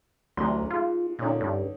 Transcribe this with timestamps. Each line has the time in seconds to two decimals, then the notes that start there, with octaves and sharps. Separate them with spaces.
0.37 A1 D2 F#3 C6
0.70 G#2 F4
1.19 A#2 D3 C#4 D#4
1.41 G2